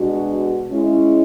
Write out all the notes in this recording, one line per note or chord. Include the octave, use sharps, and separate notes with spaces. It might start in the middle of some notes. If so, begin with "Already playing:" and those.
Already playing: B2 G#3 D4 F#4
G#3 C#4 E4